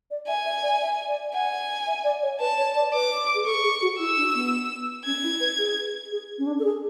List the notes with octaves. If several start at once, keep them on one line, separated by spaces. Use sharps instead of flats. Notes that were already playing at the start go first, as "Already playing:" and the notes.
D5
E5 G#5
E5
D5
E5
D5
F#5 G#5
E5
D5
C#5
B4 A5
C#5
D5
B4 D6
G#4
A4 C#6
G#4
F#4
E4 E6
D4
B3
C#4 G#6
E4
B4
G#4
G#4
C#4
D4
A4
G#4